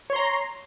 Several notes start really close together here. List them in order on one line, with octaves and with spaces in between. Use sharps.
C#5 C6 A#5